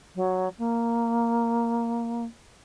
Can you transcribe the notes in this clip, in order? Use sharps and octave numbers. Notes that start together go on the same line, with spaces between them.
F#3
A#3